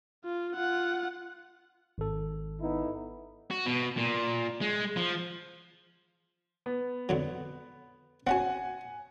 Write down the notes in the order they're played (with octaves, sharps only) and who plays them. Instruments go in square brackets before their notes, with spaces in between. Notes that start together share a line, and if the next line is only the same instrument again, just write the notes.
[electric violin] F4
F4 F#5
[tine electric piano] G#1 A4
[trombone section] B3 D#4 E4
[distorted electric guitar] F#4
B2
A#2
G#3
F3
[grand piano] B3
[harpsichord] F2 D3 F#3
[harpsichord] C4 C#4 F#4 [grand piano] F#5 G#5